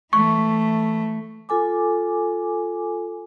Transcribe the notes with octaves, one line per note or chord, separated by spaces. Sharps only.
E3 A3 C#6
F4 A4 G#5 D6